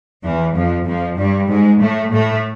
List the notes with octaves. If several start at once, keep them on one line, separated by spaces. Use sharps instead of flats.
E2 E3
F2 F3
F2 F3
G2 G3
G#2 G#3
A2 A3
A2 A3